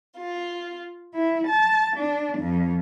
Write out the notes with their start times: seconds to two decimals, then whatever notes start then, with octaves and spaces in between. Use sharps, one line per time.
0.17 F4
1.14 E4
1.47 A5
1.97 D4
2.38 F2